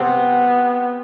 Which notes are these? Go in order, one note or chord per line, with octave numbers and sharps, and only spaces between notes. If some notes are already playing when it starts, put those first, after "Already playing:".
Already playing: C3 B3 C4